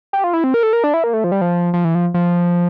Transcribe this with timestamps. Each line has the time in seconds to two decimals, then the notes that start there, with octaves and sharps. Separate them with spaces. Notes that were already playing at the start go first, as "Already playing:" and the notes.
0.13 G4
0.24 F4
0.33 E4
0.44 C4
0.54 A#4
0.63 A4
0.73 A#4
0.84 D4
0.94 E4
1.04 A#3
1.13 A3
1.24 F3
1.32 G3
1.41 F3
1.74 F3
1.85 E3
1.95 F3
2.14 F3